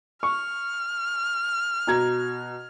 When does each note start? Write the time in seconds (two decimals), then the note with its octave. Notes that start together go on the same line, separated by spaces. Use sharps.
0.23 C#6 F6
1.87 B2 A#5 G#6